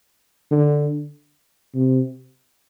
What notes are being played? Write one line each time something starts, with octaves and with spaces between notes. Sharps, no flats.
D3
C3